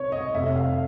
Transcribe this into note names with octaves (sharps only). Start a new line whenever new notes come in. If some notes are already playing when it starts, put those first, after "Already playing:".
Already playing: C2 C#5
D#5
F1 F2 C3 E5
F5